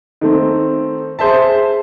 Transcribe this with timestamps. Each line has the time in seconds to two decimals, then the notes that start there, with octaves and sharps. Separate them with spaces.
0.21 D#3 A3 C4
1.19 G#4 C5 E5 A5